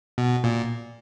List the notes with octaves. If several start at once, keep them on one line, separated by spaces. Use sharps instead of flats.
B2
A#2